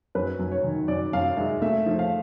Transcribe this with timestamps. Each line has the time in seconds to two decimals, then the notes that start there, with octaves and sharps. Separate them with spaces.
0.15 F#2 B4
0.39 F#2
0.51 C#5
0.64 D#3
0.88 F#2 D5
1.13 F#2 F5
1.37 G#3 E5
1.62 A3 E5
1.86 F3
1.99 F5